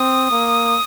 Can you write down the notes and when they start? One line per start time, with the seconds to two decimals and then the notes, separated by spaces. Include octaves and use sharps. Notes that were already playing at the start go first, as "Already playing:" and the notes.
Already playing: C4 D#6
0.31 A#3